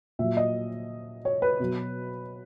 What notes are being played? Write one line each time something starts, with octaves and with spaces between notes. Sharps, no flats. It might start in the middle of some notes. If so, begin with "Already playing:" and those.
A#2 F#3 E5
D#5
C#5
B4
B2 F#3